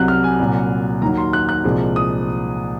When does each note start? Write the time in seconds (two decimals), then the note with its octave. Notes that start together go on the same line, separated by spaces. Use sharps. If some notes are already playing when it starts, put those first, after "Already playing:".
Already playing: C2 C3 F#3 F#6
0.08 F6
0.24 G#5
0.39 C2 A#2 F#3
1.01 D#2 D#3 F#3 A#5
1.17 C6
1.33 F#6
1.49 F#6
1.64 C2 A#2 F3 G#3
1.96 D#6